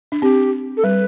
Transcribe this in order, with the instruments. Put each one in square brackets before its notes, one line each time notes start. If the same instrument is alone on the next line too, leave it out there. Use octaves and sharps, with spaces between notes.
[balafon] D4
[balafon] C4 [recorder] G4
[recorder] A4
[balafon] G3 [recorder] B4